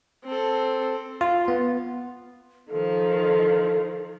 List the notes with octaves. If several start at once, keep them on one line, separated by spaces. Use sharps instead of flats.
C4 A4
F4
B3
D#3 F3 A4